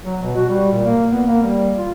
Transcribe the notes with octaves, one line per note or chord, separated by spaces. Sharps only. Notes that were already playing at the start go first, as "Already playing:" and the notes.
F#3
B2
F#4
G3
A#2
A#3
B3
A#3
G3
F4